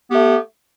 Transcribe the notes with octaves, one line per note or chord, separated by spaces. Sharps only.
A3 B3 G4